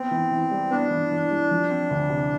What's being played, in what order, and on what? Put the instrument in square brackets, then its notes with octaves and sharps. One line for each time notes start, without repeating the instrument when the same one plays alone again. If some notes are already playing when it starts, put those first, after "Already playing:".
Already playing: [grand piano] B3 [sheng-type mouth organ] C4
[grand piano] E3
E3
G3
[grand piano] B3 [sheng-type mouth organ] D4
[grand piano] E3
E3
G3
F3
C4
D2
C3